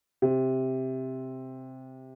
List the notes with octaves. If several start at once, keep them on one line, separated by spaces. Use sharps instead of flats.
C3